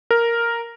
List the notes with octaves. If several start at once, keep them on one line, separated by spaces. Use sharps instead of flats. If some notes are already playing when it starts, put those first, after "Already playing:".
A#4